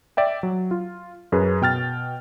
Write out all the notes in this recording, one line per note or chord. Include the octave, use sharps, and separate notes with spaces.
D5 E5 G5
F#3
F4
F#2 G#4 B4
B2 G5 F6 A6